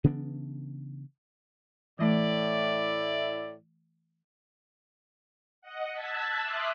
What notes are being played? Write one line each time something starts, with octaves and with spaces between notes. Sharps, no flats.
C#3 E3 B3 D4
A2 E3 A3 E4 D5
D#5 F#5
A5 E6 F#6 G#6 A6 B6
E5 C6 D6 D#6 F6 F#6